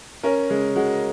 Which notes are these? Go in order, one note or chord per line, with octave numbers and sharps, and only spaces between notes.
C#4 A#4
C#3 G#3
G#3 F#4